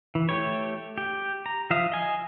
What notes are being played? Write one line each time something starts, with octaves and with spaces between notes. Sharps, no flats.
E3
A3 G4 C#5
G4
A#5
F3 E5 F5 D#6
D#5 G#5